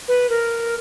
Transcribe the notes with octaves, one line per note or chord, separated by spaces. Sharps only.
B4
A#4